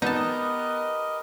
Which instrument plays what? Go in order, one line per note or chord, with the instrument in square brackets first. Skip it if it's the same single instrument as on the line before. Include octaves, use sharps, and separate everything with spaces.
[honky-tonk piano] B3 [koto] D#4 A5 [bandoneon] G4 A#4 B4 [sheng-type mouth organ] D#5